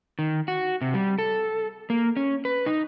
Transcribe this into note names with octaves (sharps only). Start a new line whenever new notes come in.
D#3
F#4
C3
G3
A4
A#3
C#4
B4
D#4